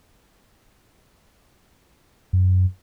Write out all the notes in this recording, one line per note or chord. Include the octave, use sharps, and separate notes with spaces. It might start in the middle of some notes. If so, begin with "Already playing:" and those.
F#2